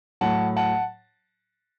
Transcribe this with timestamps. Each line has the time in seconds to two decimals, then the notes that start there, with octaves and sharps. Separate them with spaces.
0.21 A2 F#3 F#5 A5
0.56 F#5 A5